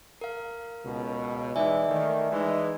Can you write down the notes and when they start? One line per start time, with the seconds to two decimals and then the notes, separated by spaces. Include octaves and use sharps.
0.21 A#4 F5
0.84 C#2 B2
1.56 E3 G#3 D#4 D5 E5 G#5
1.89 D#3 A3
2.32 E3 G#3 D#4